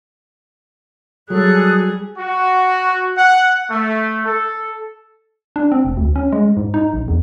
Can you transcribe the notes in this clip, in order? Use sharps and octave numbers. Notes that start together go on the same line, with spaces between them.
F#3 G3 G#4 A4 D#6 F#6
F#4
F#5
A3
A4
D4
C4
F1
D2
C#4
G#3
G#2
D#4
A#1
E2